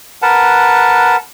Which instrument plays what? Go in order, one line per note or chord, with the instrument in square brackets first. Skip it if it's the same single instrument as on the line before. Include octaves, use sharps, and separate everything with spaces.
[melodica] A#4 B4 F#5 A5